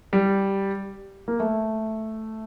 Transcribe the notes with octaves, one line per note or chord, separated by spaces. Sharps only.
G3
A#3
A3